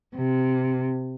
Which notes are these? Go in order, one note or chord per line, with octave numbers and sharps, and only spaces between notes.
C3